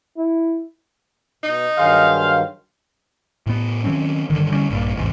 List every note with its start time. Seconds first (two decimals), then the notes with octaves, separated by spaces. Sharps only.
0.17 E4
1.43 B2 D#4
1.78 G2 D#3 F#3 G#4 C5 F5
3.46 A2 B3
3.84 D#3 F#3 C4 C#4
4.30 G2 D3 D#3
4.50 D3 G3 A#3 C#4
4.70 A#1 G2 A#2
4.96 A1 E2 G#2 C3